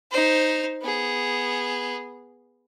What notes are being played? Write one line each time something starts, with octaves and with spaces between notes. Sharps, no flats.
D#4 C5
B3 G#4